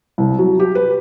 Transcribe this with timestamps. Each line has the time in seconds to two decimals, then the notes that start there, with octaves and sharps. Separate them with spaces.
0.18 C2
0.38 F#3
0.60 G4
0.75 B4